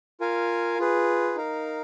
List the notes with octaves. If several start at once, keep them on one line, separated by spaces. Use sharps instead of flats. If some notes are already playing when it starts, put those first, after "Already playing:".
F4 A#4 F5 G#5
F4 G#4 B4
D#4 A#4 F5